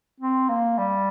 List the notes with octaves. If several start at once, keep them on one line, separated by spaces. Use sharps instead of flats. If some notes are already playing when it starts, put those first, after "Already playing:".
C4
A#3
G3